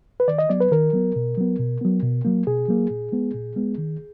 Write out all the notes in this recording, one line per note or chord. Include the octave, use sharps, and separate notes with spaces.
B4
D#3 D5
D#5
F#3 B3 D5
B4
D#3 A#4
F#3 B3
B2
F#3 B3
B2
F#3 B3
B2
F#3 A#3
B2 G#4
F#3 A#3
A#2
G#3 B3
A#2
G#3 B3
D#3